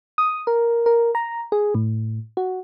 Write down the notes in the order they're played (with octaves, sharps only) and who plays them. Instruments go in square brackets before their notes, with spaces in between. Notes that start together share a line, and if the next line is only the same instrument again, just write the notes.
[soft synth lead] D#6
A#4
A#4
A#5
G#4
A2
F#4